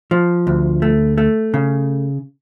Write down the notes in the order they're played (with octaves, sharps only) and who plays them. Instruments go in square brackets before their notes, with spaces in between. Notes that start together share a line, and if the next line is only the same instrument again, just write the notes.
[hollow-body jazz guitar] F3
D2
A3
A3
C#3